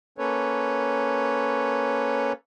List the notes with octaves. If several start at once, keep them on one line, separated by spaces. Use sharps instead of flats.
A#3 C#4 A4 B4 C#5